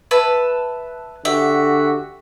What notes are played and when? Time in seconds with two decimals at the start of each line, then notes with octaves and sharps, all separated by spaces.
0.11 B4 E5 A5
1.25 D3 F#4 G4 E5